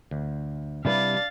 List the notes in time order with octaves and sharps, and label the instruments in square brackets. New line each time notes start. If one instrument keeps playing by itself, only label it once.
[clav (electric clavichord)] D2
[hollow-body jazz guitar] C3 G3 B4 [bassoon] D4 [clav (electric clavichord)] E4 [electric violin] F5 A6